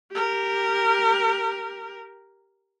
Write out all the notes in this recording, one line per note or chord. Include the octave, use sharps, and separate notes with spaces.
G4 A#4